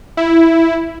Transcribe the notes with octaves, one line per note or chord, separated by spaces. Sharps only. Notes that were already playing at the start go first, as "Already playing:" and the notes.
E4